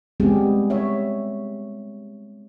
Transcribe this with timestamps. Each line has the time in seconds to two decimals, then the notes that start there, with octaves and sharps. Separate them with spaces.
0.20 G3 G#3 B3 C4 G4 G#4
0.70 C#5 E5